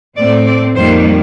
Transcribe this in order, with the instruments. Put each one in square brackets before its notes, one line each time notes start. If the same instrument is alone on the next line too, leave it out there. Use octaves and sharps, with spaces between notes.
[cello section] A2 A3 C4 D5
D5
F2 D#3 G3 A#3 C5